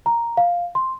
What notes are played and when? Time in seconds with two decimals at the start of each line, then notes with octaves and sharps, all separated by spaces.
0.06 A#5
0.37 F5
0.75 C6